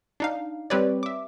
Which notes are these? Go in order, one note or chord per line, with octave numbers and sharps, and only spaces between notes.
D4 D#4 F5
G3 C4 G4 B4 C#5 D5
E5 D6